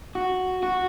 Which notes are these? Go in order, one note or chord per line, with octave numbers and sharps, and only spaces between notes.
F#4
F#4